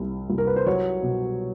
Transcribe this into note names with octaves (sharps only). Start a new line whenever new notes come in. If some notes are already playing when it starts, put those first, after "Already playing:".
Already playing: C2 C3
C2
A#4
B4
C5
F#3 C#5
B2